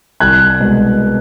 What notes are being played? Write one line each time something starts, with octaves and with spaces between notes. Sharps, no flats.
C2 F#6 G#6
B2 G#3 B3